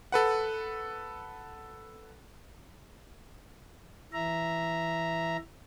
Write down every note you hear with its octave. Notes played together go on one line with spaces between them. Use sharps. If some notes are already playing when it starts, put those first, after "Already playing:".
A4 B4 F#5
E3 E5 A#5